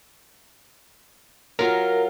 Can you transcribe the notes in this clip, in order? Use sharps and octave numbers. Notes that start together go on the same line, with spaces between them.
F#3 F4 A#4